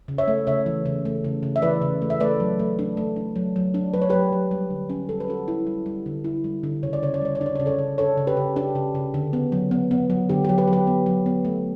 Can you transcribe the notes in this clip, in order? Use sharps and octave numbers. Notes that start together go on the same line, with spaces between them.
C#3
C#5 E5
A3
C#3 C#5 E5
E3
C#3
A3
C#3
C#3
E5
E3 B4 D5
C#3
A3
E5
A3 B4 D5
F#3
A3
D4
A3
D4
F#3
F#3
D4
F#3 B4
C#5
F#3 G4 B4
F#3
G3
D3
C#4
G3 A4
B4
C#4 F#4 A4
E4
G3
G3
D3
E4
G3
D3
C#3 C#5
D5
C#3 C#5
D5
G3 C#5
D5
D4
C#5
C#3 D5
A4 C#5
C#3
D4 A4 C#5
C#3
G4 B4
C#3
D4 G4
C#3
C#3
D3
B3
F#3
B3
B3
F#3
D3 G4
G4
F#3
G4 B4
F#3
G4 B4
B3
F#3
B3
A3